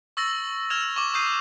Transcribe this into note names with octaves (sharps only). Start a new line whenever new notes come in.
C#6 E6 A6 A#6 F#7
E6 F6 G#6 E7 F7
C#6 D6 E7
C#6 D#6 G6 C7 D#7